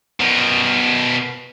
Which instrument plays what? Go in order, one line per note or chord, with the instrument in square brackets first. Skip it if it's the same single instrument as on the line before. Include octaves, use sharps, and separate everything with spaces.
[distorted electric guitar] B2 A#4